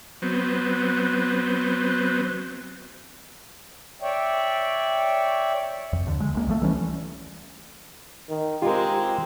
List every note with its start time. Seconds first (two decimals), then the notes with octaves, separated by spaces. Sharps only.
0.22 F#3 B3 C4
4.02 C#5 D5 E5 G5
5.93 F2
6.06 D#2 D3
6.20 G#3
6.35 C#2 A#3
6.47 C2 F3 A3
6.62 E3 G3 C#4
8.30 D#3
8.62 G#3 C4 F4 G4 A#4